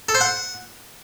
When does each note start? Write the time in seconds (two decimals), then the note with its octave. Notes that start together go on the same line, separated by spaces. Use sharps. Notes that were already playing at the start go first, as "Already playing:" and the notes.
0.09 A4
0.15 C5
0.21 F#5